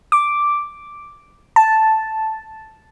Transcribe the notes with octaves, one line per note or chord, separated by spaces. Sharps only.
D6
A5